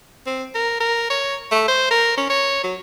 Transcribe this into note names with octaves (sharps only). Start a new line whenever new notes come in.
C4
A#4
A#4
C#5
A3
C5
A#4
C#4
C#5
F#3